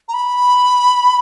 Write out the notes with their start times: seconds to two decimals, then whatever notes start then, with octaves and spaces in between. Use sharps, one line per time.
0.08 A#5
0.13 B5